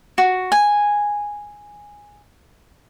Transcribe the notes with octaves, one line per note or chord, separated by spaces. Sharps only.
F#4
G#5